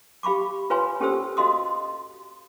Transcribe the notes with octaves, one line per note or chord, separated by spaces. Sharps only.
G4 F5 B5 C#6 D6
F4 B4 C#5 F5 G#5 C6
C#4 G4 A4 C5 E6
F#4 D#5 F5 C6 D#6